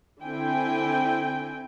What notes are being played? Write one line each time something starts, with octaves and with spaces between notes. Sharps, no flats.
D3 C4 E4 G5 G#5